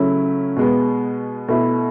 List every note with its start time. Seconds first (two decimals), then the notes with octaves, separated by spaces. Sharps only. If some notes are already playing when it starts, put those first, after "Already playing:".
Already playing: C#3 F#3 A3 C#4 E4
0.56 B2 G#3 B3
1.48 B2 A3 E4